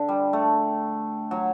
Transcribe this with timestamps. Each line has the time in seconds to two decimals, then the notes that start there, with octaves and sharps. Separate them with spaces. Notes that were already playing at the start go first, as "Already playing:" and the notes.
Already playing: D3
0.08 G3
0.33 A3
1.31 F#3